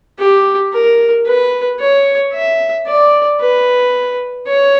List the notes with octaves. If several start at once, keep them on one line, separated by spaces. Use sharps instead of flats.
G4
A#4
B4
C#5
E5
D5
B4
C#5